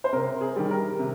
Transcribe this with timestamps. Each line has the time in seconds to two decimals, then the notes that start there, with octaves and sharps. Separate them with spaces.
0.04 C5
0.13 C3 A#4
0.41 G#4
0.56 D#3 G3
0.71 A#4
0.99 C3